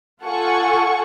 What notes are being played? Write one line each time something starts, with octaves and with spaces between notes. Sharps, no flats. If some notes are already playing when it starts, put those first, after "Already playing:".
F4 A4 F#5 G#5 C#6